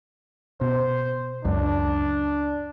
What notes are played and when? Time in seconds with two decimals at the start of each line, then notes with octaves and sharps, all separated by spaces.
0.61 B2 C5
1.45 C#2 F#2 D4